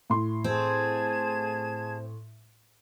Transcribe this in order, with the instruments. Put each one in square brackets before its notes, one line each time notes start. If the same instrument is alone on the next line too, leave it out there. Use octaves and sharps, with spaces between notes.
[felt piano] A2 C6
[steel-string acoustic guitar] C4 [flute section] G#4 A5 G#6